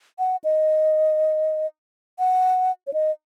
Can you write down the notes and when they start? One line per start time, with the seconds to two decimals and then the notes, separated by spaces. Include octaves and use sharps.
0.19 F#5
0.44 D#5
2.19 F#5
2.87 C#5
2.93 D#5